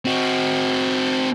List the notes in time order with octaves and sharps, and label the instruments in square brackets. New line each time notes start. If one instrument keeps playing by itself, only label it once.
[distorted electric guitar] C4 F#4